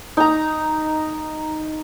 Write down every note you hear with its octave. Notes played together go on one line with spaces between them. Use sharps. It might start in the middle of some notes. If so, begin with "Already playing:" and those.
D#4 A#5